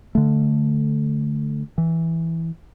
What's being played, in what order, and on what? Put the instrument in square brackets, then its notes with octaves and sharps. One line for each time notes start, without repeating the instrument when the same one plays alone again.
[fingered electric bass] D3 A3
E3